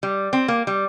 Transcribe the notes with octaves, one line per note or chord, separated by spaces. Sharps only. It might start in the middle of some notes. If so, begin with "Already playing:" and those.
G3
C4
A#3
G3